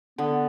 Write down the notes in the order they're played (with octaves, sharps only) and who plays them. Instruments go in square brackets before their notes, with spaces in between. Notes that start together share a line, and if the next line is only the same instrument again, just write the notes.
[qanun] D3 [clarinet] B3